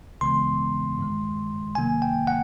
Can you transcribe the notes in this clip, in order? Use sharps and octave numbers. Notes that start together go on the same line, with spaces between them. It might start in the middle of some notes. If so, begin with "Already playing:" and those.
C#2 C#3 E3 G#3 B3 C6
G2 D#3 G#3
C#2 C3 D#3 F#3 A#3 G#5
G5
F#5